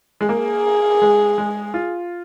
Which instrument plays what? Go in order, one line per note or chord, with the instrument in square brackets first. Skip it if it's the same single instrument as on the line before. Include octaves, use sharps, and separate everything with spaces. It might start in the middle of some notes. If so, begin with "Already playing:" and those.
[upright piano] G#3
[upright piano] A#3 [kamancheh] G#4
[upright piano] G#3
G#3
F4